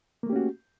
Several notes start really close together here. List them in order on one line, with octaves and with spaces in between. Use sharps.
A#3 A3 G4 C#4 F#4